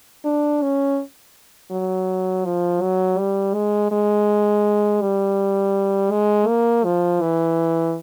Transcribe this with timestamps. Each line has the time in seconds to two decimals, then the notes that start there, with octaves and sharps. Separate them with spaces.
0.25 D4
0.62 C#4
1.71 F#3
2.45 F3
2.81 F#3
3.19 G3
3.54 G#3
3.92 G#3
5.02 G3
6.11 G#3
6.48 A#3
6.84 F3
7.21 E3